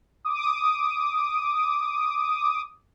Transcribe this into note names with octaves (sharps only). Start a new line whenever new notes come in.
D6 D#6